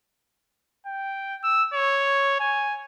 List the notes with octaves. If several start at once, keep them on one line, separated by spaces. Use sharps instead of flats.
G5
E6
C#5
G#5